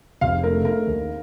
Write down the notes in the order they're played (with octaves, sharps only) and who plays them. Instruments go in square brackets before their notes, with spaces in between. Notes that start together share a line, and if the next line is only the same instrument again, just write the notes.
[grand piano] F1 [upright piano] F5
[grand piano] A3 [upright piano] A#4
[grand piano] A3 [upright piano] A#4
[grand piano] D#2